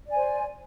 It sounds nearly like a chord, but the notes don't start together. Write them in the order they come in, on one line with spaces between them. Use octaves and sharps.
D5 G#5 C5